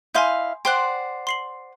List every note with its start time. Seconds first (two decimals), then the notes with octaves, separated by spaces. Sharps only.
0.15 E4 D#5 F5 G#5 C6 G6
0.65 C5 D5 F#5 G5 C6 F#6
1.27 C6 C7 F#7